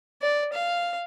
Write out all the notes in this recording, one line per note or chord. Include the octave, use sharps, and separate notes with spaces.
D5
F5